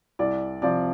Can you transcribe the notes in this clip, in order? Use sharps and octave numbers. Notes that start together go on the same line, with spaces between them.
C2 D5
C3 F3 D5